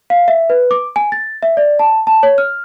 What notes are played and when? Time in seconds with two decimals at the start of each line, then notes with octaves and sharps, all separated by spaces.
0.10 F5
0.28 E5
0.50 B4
0.71 D6
0.96 G#5
1.12 A6
1.43 E5
1.57 D5
1.79 A5
2.07 A5
2.23 C#5
2.38 F6